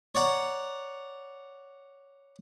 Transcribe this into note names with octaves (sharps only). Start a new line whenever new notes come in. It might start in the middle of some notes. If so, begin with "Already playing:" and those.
C#5 D5 F#5 A#5